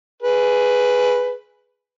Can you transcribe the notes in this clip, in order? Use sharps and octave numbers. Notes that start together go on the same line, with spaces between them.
G#4 B4